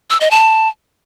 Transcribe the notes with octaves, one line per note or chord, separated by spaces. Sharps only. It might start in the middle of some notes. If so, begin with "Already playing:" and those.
E6
D#5
A5